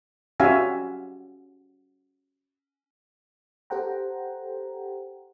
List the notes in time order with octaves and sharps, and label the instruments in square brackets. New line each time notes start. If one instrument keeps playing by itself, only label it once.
[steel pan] C#4 F#4 G4 E5 F5 G#5
[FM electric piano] G4 A4 C5 F#5 G5 A#5